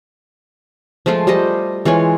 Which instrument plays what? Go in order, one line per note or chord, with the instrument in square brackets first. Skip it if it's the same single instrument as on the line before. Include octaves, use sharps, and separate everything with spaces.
[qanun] F3 G#3 A3 F4
G3 G4 C5 D#5
E3 G#3 F4 C#5